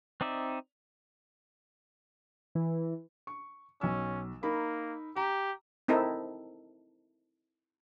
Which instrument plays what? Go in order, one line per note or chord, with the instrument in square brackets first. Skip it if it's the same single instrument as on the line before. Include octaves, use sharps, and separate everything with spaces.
[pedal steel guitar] C4 D#4 D5 E5
[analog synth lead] E3
[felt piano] C#6
[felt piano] B1 E6 [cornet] C#4
[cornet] A#3 [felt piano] D#4 A#4 B5
[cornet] G4 [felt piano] A#5
[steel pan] C4 D#4 E4 A4 A#4